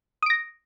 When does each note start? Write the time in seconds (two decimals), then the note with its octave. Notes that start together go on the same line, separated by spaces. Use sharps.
0.23 D#6
0.26 D7
0.30 A#6